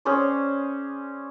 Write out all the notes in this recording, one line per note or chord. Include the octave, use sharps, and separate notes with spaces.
C#4 G#4 C5 D5